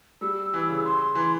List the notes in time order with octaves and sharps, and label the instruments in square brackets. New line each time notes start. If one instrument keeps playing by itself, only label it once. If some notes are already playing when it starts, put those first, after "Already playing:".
[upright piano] G3 [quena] E6
[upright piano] E3
C#3
[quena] C6
[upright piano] E3